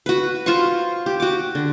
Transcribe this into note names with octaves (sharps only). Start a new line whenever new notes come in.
F#4 B4
F4 C5 C6 C#6
G4
F#4 D6
D3